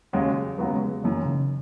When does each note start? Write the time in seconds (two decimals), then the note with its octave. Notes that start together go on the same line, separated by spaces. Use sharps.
0.13 E1 D#2 C#3 F#3 G#3
0.58 D#2 C#3 F#3 G#3 B3
0.74 G#3
0.88 F#3
1.03 F#1 F#2 D#3 E3
1.25 C#3